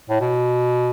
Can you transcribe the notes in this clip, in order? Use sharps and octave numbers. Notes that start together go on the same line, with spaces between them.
A2
B2